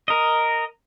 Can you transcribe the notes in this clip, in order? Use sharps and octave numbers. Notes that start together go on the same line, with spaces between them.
A#4 D#5